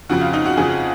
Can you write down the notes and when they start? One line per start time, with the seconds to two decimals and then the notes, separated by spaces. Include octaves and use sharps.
0.09 F2 C#3 F3 F#4
0.21 F4
0.33 D#4
0.46 F#4
0.57 F2 C#3 F3 G#4